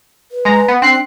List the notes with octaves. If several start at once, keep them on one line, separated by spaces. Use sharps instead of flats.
B4
G#3 A#5
B3
C4 D4 F#6 C7